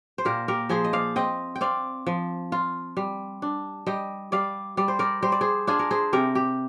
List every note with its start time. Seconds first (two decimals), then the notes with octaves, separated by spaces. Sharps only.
0.18 C5
0.25 A#2 G4 A#4
0.48 G4 A#4
0.69 F3 G#4 C5
0.84 D#5
0.93 D5 F5
1.16 C4 D#5 G5
1.56 G5
1.61 C4 D5 F5
2.06 F3
2.52 F4
2.97 G3
3.42 D4
3.86 G3 D#5 G5
4.32 G3 D5 F5
4.77 G3 D5
4.88 C5
4.99 A#4 D5
5.22 G3 C5
5.32 D5
5.41 G#4 C5
5.67 D4 F4 G#4
5.79 A#4
5.91 G#4 C5
6.13 C3 G4 A#4
6.35 G4